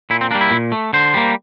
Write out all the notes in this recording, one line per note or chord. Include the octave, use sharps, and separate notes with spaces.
A#2 E4
C4
G3 A#3 D4
E4
A#2
A3
D3 C5
G3 A#3